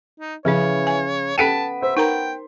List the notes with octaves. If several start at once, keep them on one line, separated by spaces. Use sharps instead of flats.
D#4
C#3 E3 F3 C#4 C#5
G#5
B3 C#4 A4 G5 A5 B6 D7 D#7
C5 E5
D#4 A#4 G5 A#5